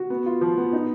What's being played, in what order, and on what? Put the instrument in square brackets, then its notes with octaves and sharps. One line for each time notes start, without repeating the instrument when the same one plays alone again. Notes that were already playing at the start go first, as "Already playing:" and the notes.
Already playing: [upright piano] F#4
B3
F4
F3
B3
D#4